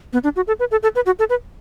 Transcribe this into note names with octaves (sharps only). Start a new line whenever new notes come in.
B3
D4
F#4
A4
B4
A4
A4
B4
F#4
A4
B4